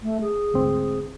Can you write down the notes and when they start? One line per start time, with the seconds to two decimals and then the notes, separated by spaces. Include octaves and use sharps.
0.03 A3
0.21 G#4
0.54 D2 G#2 C4